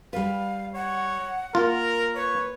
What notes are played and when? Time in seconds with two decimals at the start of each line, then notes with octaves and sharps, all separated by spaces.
0.13 G3 B4 F5
0.75 C#5 F#5
1.55 A#3 F4 A#4
2.16 B4 C#5